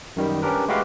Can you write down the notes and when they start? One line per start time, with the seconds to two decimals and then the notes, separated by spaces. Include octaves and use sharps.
0.16 F#2 D#3 G3
0.42 C#4 D4 G4 A#4 B4
0.68 G#3 A3 F#4 G4 B4 F5